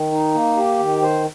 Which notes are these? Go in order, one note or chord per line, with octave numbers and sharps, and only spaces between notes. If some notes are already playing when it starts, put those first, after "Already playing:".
Already playing: D#3
D#4
A#3
G4
D#3
C5